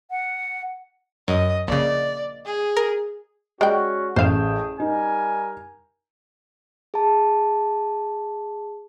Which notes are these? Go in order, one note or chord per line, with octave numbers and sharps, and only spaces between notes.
F#5
F#2 D#5
A#1 C#3 D5
G#4
A#4
G#3 C#4 F#4 D5 G5
A1 A3 G#4 C5 F5 G5 G6 E7
G3 D#4 A#4 G#5
G#4 A5